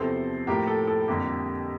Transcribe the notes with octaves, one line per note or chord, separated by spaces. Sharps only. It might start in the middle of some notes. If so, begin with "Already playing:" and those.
Already playing: E2 C3 F3 C4 A4 C5
A2 F3 A#3 G4 A#4
A4
A4
F2 D3 G3 A#3 G4